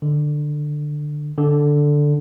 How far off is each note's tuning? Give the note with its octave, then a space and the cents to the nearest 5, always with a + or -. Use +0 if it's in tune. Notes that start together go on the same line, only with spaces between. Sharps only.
D3 +15
D3 +0